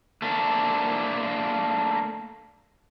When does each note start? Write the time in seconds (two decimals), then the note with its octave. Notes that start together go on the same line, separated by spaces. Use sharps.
0.22 A3 A#3 D4